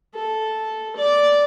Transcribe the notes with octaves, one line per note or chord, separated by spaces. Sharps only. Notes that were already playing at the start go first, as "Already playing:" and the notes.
A4
D5 D6